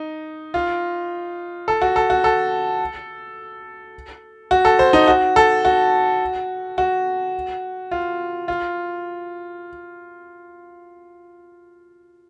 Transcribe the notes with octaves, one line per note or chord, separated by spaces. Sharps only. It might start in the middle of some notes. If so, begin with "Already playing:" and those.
Already playing: D#4
F4
A4
F#4
A4
F#4
A4
F#4
A4
C5
D#4
F#4
A4
F#4
F#4
F4
F4